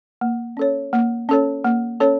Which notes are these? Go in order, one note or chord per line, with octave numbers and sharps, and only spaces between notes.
A#3
C#4 A4 C#5
A#3
C#4 A4 C#5
A#3
C#4 A4 C#5